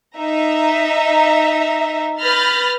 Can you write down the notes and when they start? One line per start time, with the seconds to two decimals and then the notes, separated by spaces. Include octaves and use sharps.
0.18 D#4 E5 A#5
2.21 B4 B5 F6 G6 A6 A#6